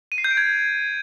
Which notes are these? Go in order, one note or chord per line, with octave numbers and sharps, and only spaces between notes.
D#7
C7
G6
D7
G#6